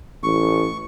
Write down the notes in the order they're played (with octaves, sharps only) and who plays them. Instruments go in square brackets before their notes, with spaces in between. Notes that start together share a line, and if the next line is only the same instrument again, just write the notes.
[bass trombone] A1 [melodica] C#6